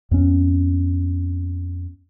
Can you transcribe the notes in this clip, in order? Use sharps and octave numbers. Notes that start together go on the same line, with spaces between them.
F2 B3 C#4